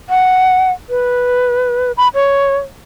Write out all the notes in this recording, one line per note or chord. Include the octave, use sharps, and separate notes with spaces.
F#5
B4
B5
C#5